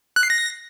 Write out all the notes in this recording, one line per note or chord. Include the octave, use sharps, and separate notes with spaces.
F#6
C7
A#6